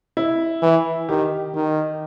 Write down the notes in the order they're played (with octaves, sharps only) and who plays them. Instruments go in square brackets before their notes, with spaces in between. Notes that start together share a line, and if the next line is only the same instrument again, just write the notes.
[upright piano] E4
[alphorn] E3
[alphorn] D#3 [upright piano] G4
[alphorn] D#3